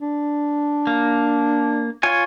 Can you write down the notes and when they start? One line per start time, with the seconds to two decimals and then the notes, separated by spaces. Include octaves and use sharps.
0.01 D4
0.87 A#3
2.03 F4 C#5 G#5